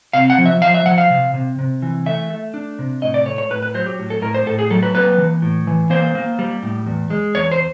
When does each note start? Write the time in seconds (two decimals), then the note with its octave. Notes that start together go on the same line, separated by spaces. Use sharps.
0.13 C3 F5
0.30 F#5
0.38 F3
0.46 E5
0.62 F3 F5
0.74 E5
0.86 F3 F#5
0.98 F5
1.10 C3
1.34 C3
1.59 C3
1.82 E3
2.06 A3 E5
2.30 A3
2.54 D4
2.79 C3
3.02 A2 D#5
3.14 D5
3.26 A3 C#5
3.38 C#5
3.50 A2 B4
3.62 B4
3.74 F#3 C5
3.87 G4
3.99 A2
4.10 A4
4.22 A2 A#4
4.34 C5
4.46 A2 A4
4.59 G#4
4.71 F#3 A4
4.83 B4
4.95 A#3 B4
5.18 E3
5.42 A2
5.67 E3
5.90 A#3 C5
6.15 A#3
6.39 G3
6.63 A2
6.86 E2
7.10 G#3
7.35 E2 C#5
7.52 C5